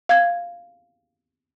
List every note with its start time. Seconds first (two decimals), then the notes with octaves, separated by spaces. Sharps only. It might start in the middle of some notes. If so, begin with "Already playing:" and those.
0.09 F5 G#6